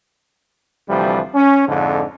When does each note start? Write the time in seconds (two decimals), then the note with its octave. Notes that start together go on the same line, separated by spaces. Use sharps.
0.89 D2 C3 E3 F3 G3
1.34 C#4
1.68 F2 G#2 D3